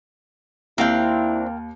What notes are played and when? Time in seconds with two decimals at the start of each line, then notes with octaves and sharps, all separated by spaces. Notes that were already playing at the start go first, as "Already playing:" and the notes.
0.78 D#2 C4 D4 E4 A#4 F5 G5